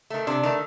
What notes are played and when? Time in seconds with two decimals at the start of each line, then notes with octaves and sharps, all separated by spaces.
0.10 D#3 A3
0.27 C3 D4
0.43 D#3 A3